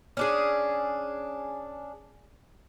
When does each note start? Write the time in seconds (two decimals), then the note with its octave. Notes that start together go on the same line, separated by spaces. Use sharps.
0.17 C#4 D4 G#4